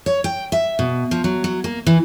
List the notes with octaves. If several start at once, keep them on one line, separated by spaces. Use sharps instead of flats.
C#5
G5
E5
B2
F3
F#3
F#3
A#3
E3